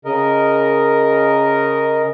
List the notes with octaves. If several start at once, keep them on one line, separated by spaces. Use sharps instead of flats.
C#3 A#4 D#5